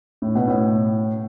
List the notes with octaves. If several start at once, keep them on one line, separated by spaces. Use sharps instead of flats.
A2
B2
A2